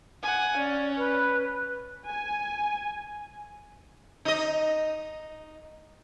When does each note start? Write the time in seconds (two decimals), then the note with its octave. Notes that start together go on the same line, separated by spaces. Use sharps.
0.23 F#5 G#5
0.57 C#4 D5
0.97 B4
2.07 G#5
4.25 D#4 D#5